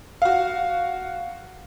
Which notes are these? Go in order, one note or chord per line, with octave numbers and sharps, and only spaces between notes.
F#4 F5